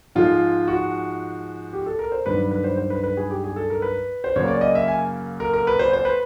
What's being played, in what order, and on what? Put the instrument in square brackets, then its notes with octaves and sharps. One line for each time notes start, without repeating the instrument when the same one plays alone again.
[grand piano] G#2 F3 G#3 F4
F#4
G4
A4
A#4
C5
G2 D#3 F#3 B4
B4
C5
C5
B4
B4
G#4
G4
G#4
A4
A#4
B4
C5
F#2 C#3 F#3 A#3 C#5
D5
D#5
E5
G#5
A#4
A#4
B4
C5
C5
B4